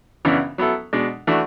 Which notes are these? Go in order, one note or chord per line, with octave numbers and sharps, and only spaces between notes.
F#2 C#3 E3 B3 D4
F#3 B3 E4 A4
B2 G#3 D4
E3 A3 D4 F#4